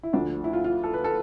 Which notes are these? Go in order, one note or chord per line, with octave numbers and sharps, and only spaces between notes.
E4
D2 D3 F3 D4
E4
F4
F4
A4
B4
A4